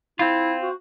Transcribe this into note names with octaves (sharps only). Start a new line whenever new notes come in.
C4 E4 F4
F#4